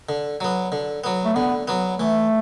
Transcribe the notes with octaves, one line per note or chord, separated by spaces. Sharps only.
D3
F#3 B3
D3
F#3 B3
A3
D3 B3
F#3 B3
E3 A3